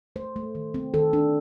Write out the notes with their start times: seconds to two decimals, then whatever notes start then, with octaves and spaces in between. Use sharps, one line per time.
0.16 A3 C5
0.36 A3
0.55 D#3
0.74 C4
0.94 D#3 A4
1.13 D4